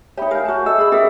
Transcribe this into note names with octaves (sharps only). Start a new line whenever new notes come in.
D#4 G4 C#5 E5 B5
A#4 F5 G#5 G6
F#4 A5
A4 D#5 E5 E6
G#4 B5
C#4 G4 G#4 A#4 E5